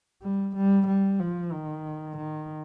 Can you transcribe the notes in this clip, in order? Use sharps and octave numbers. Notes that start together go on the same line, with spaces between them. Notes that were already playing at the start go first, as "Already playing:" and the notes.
G3
G3
G3
F3
D#3
D#3